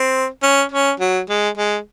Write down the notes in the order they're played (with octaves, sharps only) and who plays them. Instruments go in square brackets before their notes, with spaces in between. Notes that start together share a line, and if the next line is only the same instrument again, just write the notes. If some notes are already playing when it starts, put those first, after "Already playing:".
Already playing: [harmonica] C4
C#4
C#4
F#3
G#3
G#3